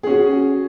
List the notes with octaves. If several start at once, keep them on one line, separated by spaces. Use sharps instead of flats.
C#4 F#4 G#4